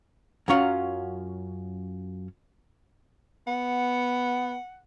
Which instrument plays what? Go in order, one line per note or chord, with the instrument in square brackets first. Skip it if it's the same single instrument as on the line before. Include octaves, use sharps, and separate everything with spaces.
[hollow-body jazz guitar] F#2 F#3 C#4 F4 F#5
[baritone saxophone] B3 [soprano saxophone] F#5